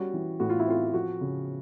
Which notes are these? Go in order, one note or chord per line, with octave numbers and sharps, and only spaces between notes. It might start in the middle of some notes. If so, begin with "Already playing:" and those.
Already playing: G3 C#4 F#4
E3
A2 F#4
F4
E4
C4 F4
F3 F#4
C#3